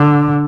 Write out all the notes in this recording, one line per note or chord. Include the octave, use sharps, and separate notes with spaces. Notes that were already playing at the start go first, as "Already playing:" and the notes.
Already playing: D3